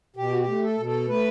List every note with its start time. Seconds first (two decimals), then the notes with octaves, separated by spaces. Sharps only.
0.16 B2 G4
0.31 F#4
0.40 G4
0.47 A3
0.63 A4
0.78 B2
0.86 A4
1.08 A3 B4